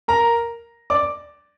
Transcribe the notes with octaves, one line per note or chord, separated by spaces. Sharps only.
A#4 A#5
D5 D6